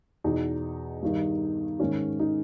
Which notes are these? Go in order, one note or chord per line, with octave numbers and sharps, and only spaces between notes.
E2 B2 D#4
G2 D#3
G#2 D#3 C#4
D#4